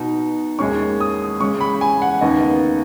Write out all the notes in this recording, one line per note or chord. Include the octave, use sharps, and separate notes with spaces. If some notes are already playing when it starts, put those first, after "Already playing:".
Already playing: B2 B3 D#4
D#2 D#3 G#3 C#4 C#6
D#6
C#3 G#3 C#4 C#6
B5
G#5
F#5
D#2 C#3 B3 D#4 D#5